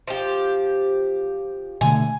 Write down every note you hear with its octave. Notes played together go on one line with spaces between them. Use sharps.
F3 G4
B2 D3 A3 G#5